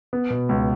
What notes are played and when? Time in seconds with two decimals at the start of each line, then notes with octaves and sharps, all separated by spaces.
0.13 B3
0.30 B2
0.49 C#2